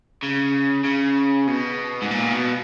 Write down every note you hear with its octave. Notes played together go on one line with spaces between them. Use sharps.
C#3
C#3
B2
G#2
A#2
B2